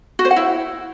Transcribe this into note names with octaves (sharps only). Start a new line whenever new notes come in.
F#4
C5
F#5
E4